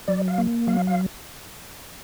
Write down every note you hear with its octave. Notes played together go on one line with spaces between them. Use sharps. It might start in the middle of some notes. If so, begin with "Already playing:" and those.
F#3 D5
F5
A#3
F#3 F5
F5